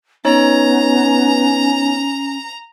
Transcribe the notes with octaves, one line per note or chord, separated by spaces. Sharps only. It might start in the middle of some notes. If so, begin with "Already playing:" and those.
B3 C#4 D#4 C#5 A#5